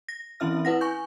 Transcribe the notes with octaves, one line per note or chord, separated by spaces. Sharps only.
A#6
E3 C4 C#4 E4 E5 F6
E4 B4 F#5 A#6
G#5 C#6 G6